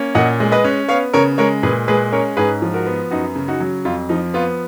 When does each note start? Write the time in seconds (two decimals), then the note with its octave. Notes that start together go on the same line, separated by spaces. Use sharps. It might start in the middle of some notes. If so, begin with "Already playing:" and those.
Already playing: A#3 C#4
0.15 A#2 D#5 F#5
0.40 G#3
0.52 B4 D#5
0.64 C#4
0.89 B3 C#5 F5
1.13 C#3 A#4 C#5
1.38 G#3 A#4 C#5
1.63 A#2 G#4 B4
1.88 G#3 G#4 B4
2.12 C#4 A#4 C#5
2.37 G#2 G#4 B4
2.62 F3
2.74 F#4 A#4
2.86 B3
3.11 F#2 D#4 F#4
3.36 C#3
3.48 D#4 F#4
3.60 F#3
3.85 F2 F4
4.09 F3 D#4
4.34 B3 F4